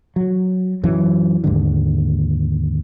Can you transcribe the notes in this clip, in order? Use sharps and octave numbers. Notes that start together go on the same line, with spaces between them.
F#3
F#2 E3 F#3
D#2 G#2 D3